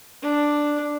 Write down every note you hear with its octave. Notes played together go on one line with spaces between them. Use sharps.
D4